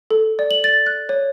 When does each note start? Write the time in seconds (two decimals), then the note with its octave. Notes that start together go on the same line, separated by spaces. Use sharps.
0.11 A4
0.39 D5
0.51 F#7
0.64 A6
0.86 F#6
1.09 C#5